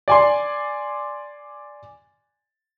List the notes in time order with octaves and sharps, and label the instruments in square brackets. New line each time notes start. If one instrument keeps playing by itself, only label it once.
[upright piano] D5 G#5 C6